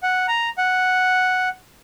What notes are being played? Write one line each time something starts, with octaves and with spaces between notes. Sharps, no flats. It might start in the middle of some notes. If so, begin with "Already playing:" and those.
F#5
A#5
F#5